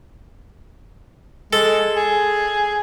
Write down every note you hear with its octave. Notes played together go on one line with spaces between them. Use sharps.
G#3 A4
G#4